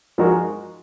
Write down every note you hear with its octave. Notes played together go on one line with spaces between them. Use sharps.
F3 G#3 D#4 F#4 A#4